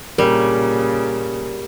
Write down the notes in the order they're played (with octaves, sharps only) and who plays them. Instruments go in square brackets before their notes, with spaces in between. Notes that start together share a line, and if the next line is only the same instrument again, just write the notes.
[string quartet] A#2 C#3 [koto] G3 [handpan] A#4